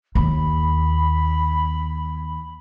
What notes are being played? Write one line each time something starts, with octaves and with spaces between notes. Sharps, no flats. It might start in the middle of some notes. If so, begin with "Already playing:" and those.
D#2 B5